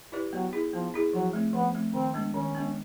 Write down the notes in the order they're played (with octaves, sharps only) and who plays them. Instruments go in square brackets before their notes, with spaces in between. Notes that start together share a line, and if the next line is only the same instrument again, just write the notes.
[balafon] E4 G4 B4 D5
[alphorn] F#3 [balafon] B3
[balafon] E4 G#4
[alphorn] F3 [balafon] B3
[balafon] E4 G#4
[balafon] F3 [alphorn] F#3
[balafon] A3 C4
[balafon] F3 [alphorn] B3
[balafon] A3 C4
[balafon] D#3 [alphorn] C4
[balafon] G#3 B3 D4
[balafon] D#3 [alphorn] C#4
[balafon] G#3 B3 D4